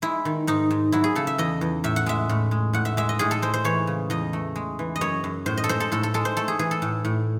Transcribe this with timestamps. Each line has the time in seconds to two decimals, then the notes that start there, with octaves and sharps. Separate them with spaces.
0.02 G#3 E4
0.25 D#3
0.47 G#2 D#4
0.70 G#2
0.92 F#3 E4
1.04 G#4
1.15 C#3 A4
1.27 E5
1.38 E2 D#5
1.61 E2
1.84 A2 E5
1.96 F#5
2.06 G#3 E5
2.29 A2
2.51 G#3
2.73 A2 F#5
2.85 E5
2.97 G#3 E5
3.09 D#5
3.19 A2 G#4
3.31 A4
3.42 G#3 C5
3.54 C5
3.64 E3 C#5
3.87 C#3
4.10 E2 D#5
4.33 A3
4.56 G#3
4.79 E3
4.96 D#5
5.01 F#2 C#5
5.24 F#2
5.46 A2 C5
5.57 D#5
5.64 A4
5.69 G#3 C5
5.80 A4
5.92 A2 A4
6.03 A4
6.14 G#3 A4
6.25 C5
6.37 A3 A4
6.48 G#4
6.59 E3 G#4
6.71 A4
6.82 A2
7.05 A2